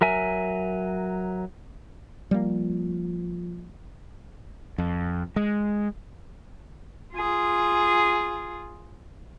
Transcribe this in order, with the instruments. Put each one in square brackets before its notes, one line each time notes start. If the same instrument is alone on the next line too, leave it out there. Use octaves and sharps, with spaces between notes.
[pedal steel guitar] F#3 A#4 E5 G#5
[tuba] F3 [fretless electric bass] G3 G#3 A#3
[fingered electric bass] F2
G#3
[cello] F4 G#4